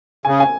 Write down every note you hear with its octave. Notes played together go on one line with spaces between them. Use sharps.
C#3 G#5
G#5